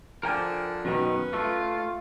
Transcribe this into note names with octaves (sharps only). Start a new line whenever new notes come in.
D3 F3 A#4 G5 G#5
F#2 B2 D#3 C#4 B4
A3 F4